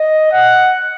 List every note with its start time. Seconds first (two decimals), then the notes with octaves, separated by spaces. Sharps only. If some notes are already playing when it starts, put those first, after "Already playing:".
Already playing: D#5
0.32 F#5